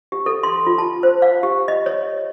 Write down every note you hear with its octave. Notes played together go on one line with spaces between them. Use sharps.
G4
A4
C6
F4
A5
C5
F5
G4
D#5
C#5